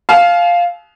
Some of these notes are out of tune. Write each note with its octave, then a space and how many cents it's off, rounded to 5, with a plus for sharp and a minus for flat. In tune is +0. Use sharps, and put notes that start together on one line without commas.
F5 +0 A5 -45